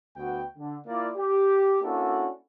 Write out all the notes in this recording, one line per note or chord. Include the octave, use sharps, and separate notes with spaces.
D2 B3 F#4 G5
D3
A#3 E4 F4 D5
G4
A#3 C#4 D4 E4 F#4 A4